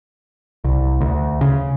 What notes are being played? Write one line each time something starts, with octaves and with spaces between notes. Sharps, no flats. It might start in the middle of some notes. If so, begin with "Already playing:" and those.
C2
D2
C#3